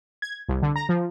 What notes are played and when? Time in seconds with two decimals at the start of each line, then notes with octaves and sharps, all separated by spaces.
0.22 G#6
0.49 C2
0.62 D3
0.76 A#5
0.89 F3